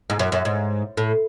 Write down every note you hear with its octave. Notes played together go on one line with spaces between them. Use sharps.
G#2
F#2
F#2
G#2
A2